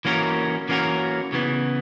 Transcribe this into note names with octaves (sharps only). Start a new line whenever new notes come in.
E3 A#3 C#4 F#4 A#4
E3 A#3 C#4 F#4 A#4
C#3 E3 B3